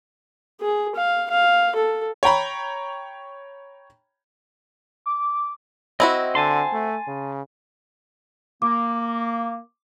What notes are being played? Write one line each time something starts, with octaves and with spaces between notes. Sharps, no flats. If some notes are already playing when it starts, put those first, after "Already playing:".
G#4
F5
F5
A4
C#5 G5 A#5 B5
D6
C4 E4 F#4 D#5
D3 G#5 A5 C6
A3
C#3
A#3 D6